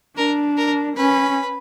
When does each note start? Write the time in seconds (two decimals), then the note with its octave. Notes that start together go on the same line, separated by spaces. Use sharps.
0.17 D4 A#4
0.57 A#4
0.96 C#4 B4